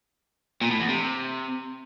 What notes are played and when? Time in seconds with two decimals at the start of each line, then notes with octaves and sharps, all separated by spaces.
0.61 A#2
0.70 A2
0.80 E2
0.89 C3